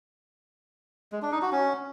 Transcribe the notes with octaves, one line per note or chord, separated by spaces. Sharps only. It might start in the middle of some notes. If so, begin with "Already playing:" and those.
G#3
D4
D#4
F#4
C#4